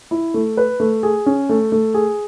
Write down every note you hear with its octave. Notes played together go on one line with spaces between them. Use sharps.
E4
A3
B4
A3
G#4
C#4
A3
A3
G#4